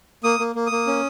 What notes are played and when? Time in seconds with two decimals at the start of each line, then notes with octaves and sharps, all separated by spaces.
0.24 A#3 D#6
0.39 A#3
0.55 A#3
0.66 D#6
0.72 A#3
0.87 C#4